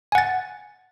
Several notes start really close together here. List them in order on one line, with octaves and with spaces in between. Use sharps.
G#5 F#5 A6